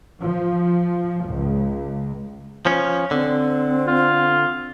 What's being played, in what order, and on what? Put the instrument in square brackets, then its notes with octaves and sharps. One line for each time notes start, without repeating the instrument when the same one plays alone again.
[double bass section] F3
C#2
[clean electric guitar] F3 C#4
[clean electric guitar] D3 [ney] C4
[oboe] F4